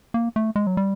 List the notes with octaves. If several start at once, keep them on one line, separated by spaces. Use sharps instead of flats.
A#3
A3
G#3
F#3
G3